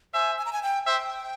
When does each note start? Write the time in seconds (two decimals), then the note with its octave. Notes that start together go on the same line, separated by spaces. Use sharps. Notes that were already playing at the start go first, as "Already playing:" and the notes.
0.14 C5 E5 G#5
0.38 G#5
0.45 A#5
0.53 G#5
0.63 G5
0.86 C5 E5 G5